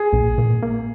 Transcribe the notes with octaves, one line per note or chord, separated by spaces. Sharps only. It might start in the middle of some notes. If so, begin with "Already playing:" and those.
Already playing: G#4
A#1
A#2
A#3